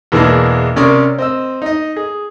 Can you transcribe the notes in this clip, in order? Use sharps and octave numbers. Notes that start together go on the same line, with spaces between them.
E2 B2 E3 G#3 A#3 D4
C3 C#4 A#4 D5 C#6 D#6
C4 D#5 E6
D#4 D#5
G#4